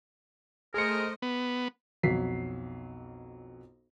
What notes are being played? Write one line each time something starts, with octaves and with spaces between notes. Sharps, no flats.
A3 G#4 A#4 C5 D#5 C#7
B3
B1 F2 F#3 B6 C7